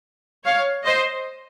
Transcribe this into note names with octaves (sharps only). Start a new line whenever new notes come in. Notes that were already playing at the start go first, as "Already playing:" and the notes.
C#5 F5
C5 D#5